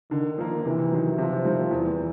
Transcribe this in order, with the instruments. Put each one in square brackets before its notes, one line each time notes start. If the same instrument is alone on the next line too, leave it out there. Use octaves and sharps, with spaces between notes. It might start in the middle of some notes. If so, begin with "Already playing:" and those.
[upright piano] D3 [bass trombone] D#3
[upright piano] F3 A#3
[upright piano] C3 [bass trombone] E3
[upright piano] D#3 F#3
[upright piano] C3 [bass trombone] F3
[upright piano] D#3 G3 C4
[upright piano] E2 [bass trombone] E3